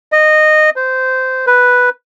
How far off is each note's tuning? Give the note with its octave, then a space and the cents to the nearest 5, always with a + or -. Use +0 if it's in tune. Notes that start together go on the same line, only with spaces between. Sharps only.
D#5 -15
C5 -15
B4 +0